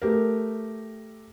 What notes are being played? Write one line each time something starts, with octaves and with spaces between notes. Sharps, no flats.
A3 G4 A#4